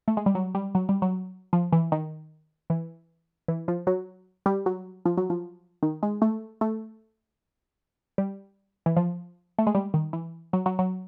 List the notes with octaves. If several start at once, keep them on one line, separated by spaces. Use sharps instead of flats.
A3
G#3
G3
F#3
G3
F#3
G3
F#3
F3
E3
D#3
E3
E3
F3
F#3
G3
F#3
F3
F#3
F3
D#3
G#3
A3
A3
G3
E3
F3
A3
G#3
G3
D#3
E3
F#3
F#3
F#3